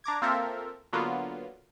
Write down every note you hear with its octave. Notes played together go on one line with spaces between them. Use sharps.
D4 A#5 D6 G#6
A#3 C4 F4 A4 A#4 E5
D3 F#3 A#3 B3 F4